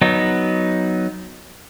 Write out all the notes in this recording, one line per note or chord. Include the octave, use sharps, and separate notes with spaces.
F#3 B3 D#4